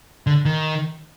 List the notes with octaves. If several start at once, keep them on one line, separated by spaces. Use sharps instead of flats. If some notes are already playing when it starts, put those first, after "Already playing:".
D3
D#3